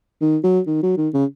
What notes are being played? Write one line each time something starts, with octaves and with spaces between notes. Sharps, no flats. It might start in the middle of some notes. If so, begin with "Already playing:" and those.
D#3
F#3
D#3
F#3
D#3
C#3